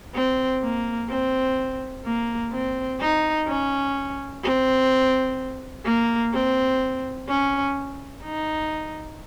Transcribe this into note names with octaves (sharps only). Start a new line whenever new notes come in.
C4
A#3
C4
A#3
C4
D#4
C#4
C4
A#3
C4
C#4
D#4